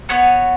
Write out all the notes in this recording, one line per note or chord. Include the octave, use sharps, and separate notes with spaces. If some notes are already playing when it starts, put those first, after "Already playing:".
B3 F#4 C#5